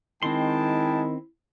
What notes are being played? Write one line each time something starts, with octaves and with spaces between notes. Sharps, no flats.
D#3 G#3 C4 E4 G5 A5 C6